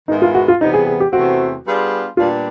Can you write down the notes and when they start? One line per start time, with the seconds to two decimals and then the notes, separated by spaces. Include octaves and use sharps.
0.08 G#2 D#3 G#3 B3 D#4 E4
0.22 F4
0.35 F#4
0.48 F4
0.61 E2 C3 E3 G3 B3 D#4
0.74 G#4
0.87 G#4
1.00 G4
1.13 E2 C3 E3 A3 C4 F#4
1.65 G3 B3 D4 F4 G#4
2.17 A#2 G3 B3 D4 F4